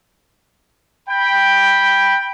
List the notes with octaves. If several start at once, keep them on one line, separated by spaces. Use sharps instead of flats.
G5 B5